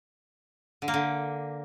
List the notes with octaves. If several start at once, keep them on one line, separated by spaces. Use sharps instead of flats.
D3
A#3
D3